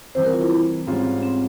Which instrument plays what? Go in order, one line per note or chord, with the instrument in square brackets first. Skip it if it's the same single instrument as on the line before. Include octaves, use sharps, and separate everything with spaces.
[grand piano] C3 E3 G3 [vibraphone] C5
[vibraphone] A#4
F4
E4
[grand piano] G#2 G3 C#4 F4 [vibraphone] C4
[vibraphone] C4